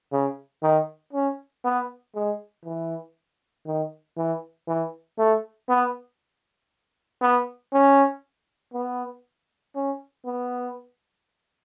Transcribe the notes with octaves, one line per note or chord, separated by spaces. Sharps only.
C#3
D#3
C#4
B3
G#3
E3
D#3
E3
E3
A3
B3
B3
C#4
B3
C#4
B3